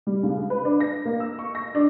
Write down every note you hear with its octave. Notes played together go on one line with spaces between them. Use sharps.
G3
C#2
B4
D4
A#6
A#3
E6
C#6
A#6
D4